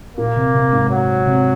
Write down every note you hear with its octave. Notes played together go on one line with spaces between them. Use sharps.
A#2 A#3
C3
C3
G#2
F#3
C3